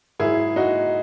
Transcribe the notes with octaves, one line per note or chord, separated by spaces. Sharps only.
G#2 F#3 E4 G#4
D#4 F#4